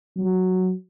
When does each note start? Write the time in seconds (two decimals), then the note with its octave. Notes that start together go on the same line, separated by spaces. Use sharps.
0.17 F#3